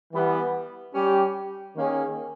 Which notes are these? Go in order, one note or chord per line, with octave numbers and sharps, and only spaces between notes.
E3 G3 B3 E4
G3 C#4 G4
D#3 A#3 C#4 G#4